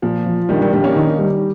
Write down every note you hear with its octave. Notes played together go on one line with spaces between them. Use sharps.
A#2 F3
F3
A#1 D#3 G3
D#3 G3
A#1 D#3 G3
A#3 C#4
D#3
G3